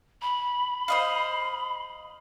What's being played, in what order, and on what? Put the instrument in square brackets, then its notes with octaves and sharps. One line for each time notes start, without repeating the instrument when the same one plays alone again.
[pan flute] B5
[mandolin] C5 D#5 F5